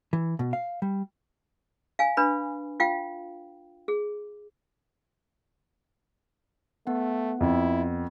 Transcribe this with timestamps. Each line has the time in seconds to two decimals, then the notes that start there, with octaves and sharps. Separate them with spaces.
0.13 E3
0.39 B2
0.53 F5
0.82 G3
1.99 F5 G#5
2.17 D4 B4 B5
2.80 F4 F5 G5
3.88 G#4
6.87 A3 B3 F#5
7.41 F2 E4